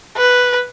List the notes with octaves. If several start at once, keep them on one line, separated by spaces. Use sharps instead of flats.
B4